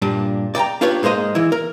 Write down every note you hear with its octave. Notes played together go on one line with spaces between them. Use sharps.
G2 A#2 D4
D5 G5 A5 A#5
D4 F4 G4 B4 C#5
G#2 G#3 A#3 C5 D#5
E3 E4
A#4